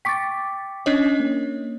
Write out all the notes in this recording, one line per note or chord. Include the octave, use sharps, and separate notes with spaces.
G5 C#6 D6 A6 B6
C#4 D4 C#5 D#5
A#3